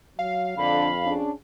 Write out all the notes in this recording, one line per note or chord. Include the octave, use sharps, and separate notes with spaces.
F#3 F5
F2 D3 B5
C#4 D4 G#4